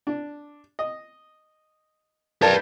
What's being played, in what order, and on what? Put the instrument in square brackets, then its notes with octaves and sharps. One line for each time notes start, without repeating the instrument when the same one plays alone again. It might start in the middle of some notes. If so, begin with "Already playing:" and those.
[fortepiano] D4
D#5
[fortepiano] A#4 A5 [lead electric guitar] B4 D5